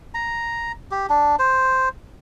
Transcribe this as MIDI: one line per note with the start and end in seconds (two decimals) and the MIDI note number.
0.14 0.72 82
0.91 1.06 67
1.09 1.36 62
1.39 1.89 72